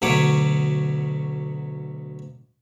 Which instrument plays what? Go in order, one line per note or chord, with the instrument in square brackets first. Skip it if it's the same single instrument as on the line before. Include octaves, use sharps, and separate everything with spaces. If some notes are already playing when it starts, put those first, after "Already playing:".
[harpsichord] D2 B2 F#3 C#5 D6